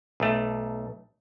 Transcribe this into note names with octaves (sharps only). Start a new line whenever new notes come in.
B1 A3